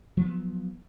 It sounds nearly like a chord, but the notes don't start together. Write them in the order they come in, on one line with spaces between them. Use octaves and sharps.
F3 B3 F#3